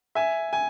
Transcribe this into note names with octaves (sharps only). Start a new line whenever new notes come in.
E5 G#5
G#5